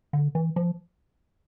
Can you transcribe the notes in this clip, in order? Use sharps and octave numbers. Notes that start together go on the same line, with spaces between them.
D3
E3
F3